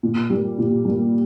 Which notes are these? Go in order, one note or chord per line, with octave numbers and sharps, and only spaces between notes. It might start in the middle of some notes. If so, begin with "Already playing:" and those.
A#2
G3 A#3
A#2
G3 A#3